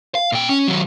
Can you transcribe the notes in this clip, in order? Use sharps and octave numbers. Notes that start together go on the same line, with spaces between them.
F5
A#2 G5
C#4
D#3 F#3